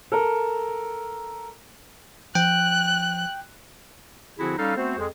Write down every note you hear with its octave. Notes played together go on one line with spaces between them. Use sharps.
A4 A#4
F3 G5 F#6
D3 F3 C4 E4 F#4 G#4
G3 C#4 D#4 A4 F5
A3 B3 C4 F#4 C5
F2 G#3 G#4